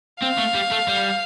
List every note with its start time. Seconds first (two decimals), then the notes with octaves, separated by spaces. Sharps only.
0.21 C4 F5
0.38 A3
0.55 G3
0.71 A3
0.88 G3